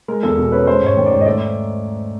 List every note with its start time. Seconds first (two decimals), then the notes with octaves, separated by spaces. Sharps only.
0.08 G#3 A#4
0.23 E2 A4
0.38 B2
0.52 C#4 B4
0.67 G#3 C5
0.82 G#2 C#5
0.97 D#3
1.06 D5
1.11 G#2
1.21 D#5
1.26 A3 D5